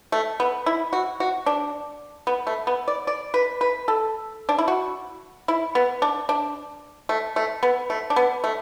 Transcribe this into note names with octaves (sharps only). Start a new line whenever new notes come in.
A3
B3
E4
F#4
F#4
D4
B3
A3
B3
D5
D5
B4
B4
A4
D4
E4
F#4
E4
B3
D4
D4
A3
A3
B3
A3
D4
B3
A3